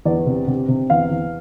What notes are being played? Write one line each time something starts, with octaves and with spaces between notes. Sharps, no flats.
E2 D5
C3
C3
C3
E2 F5
E2